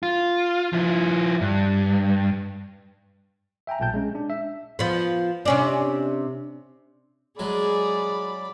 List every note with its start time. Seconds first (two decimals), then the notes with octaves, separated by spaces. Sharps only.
0.03 F4
0.73 F3 E4
1.41 G2
3.67 E5 G5 G#5 A#5
3.80 B1 A#2 G5 A5 G6
3.94 G#3 C#4
4.15 D4
4.30 E5
4.79 F3 B3
5.45 C3 C#4 D4
7.39 F#3 G#3 G#4 D5 B5